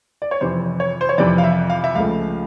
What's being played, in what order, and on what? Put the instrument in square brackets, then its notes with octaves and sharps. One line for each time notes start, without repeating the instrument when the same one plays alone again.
[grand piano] D5
C#5
F2 C3 E3 C5
C#5
C5
C#5
F2 C3 E3 D5
F5
E5
F5
E5
C#2 C#3 F3 A3 F5